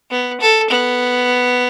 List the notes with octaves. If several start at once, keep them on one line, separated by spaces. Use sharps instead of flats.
B3
A4
B3